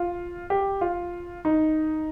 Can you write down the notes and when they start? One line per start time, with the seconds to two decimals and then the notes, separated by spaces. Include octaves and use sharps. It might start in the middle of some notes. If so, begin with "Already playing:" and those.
Already playing: F4
0.50 G4
0.81 F4
1.45 D#4